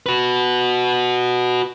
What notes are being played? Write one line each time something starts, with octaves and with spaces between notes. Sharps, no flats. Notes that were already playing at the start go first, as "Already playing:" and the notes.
F#4 B4